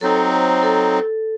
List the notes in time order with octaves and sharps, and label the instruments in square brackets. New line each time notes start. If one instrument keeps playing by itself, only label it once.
[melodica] F#3 C4 D#4 [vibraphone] A4
[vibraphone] C#5
C5
A4